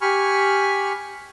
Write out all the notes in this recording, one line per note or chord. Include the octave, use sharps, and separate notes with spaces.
G4 G#5 B5 C#6 F6